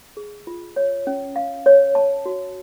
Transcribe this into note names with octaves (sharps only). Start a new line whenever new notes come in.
G#4
F4
C#5
C#4
F5
C#5
A5
F#4